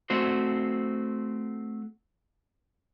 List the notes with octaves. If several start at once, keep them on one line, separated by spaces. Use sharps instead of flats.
A3 C4 F#4 C5